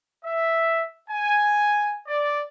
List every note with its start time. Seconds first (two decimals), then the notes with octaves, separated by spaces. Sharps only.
0.24 E5
1.10 G#5
2.08 D5